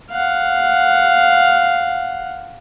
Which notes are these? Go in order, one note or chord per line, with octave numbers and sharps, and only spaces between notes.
F5 F#5